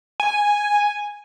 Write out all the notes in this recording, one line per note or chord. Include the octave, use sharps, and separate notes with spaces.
G#5